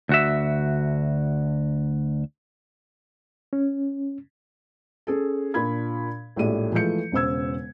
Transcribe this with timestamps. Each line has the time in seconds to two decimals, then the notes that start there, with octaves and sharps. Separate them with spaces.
0.09 D2 F#4 E5
3.53 C#4
5.07 C#4 G#4 A4
5.54 A#2 D4 F4 B5 G#6
6.36 A#1 A2 G#3 G4 D5 D#7
6.72 E3 F3 G#3 A3 G6 C#7
7.12 E1 C#3 C5 E6 G#6